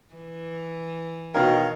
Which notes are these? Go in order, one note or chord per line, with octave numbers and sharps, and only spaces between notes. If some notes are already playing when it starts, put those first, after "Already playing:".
E3
B2 D#3 A#4 C#5 D#5 F5